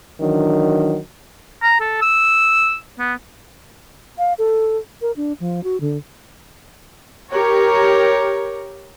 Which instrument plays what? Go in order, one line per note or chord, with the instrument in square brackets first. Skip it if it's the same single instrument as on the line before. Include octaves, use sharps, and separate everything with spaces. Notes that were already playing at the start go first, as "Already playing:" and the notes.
[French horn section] D#3 E3 F#3 D4
[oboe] A#5
A4
E6
B3
[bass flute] F5
A4
A#4
D4
F3
F#4
D3
[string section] G4 A#4 C#5